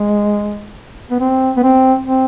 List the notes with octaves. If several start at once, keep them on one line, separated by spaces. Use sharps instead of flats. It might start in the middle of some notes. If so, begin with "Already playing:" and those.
Already playing: G#3
B3
C4
B3
C4
C4